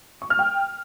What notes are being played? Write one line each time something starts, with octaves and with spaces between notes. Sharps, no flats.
C#6
F6
G5